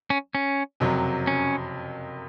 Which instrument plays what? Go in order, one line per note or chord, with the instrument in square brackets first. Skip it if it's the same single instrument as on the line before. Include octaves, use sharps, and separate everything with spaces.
[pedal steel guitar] C#4
C#4
[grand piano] F#1 F2 C3 F#3
[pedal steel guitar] C#4